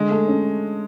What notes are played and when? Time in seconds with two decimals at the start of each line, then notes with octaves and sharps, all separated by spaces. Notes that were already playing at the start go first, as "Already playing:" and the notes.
Already playing: D3 G#3
0.11 A3
0.28 C#4